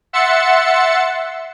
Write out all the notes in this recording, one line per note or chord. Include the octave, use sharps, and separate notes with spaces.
E5 F#5 C6 E6 A6 C#7